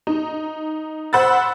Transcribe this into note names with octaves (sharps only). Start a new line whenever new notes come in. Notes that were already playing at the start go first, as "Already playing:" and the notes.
D#4
C5 F#5 B5 E6 A6